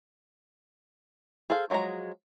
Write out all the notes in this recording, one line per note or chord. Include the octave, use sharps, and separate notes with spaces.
G#4 A4 C5 F5
F3 F#3 G#3 G#4 A#5